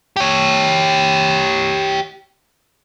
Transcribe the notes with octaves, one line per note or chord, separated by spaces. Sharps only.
G4 C#5